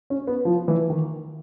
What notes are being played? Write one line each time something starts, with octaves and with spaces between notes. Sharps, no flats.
C#4
B3
F3
E3
D#3